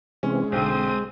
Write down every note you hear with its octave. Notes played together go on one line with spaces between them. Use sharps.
C3 E3 G#3 C4 C#4
B1 D3 C4 D#6